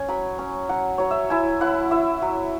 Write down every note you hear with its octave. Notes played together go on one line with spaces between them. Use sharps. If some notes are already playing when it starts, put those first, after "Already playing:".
Already playing: C#4 G#5
F#3 B5
C#4
F#3 F#5
F#3 C#5
E5
E4 G#5
E4 F#5
E4 E5
F#3